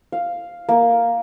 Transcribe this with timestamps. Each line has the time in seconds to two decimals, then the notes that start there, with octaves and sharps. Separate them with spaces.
0.12 F5
0.69 A#3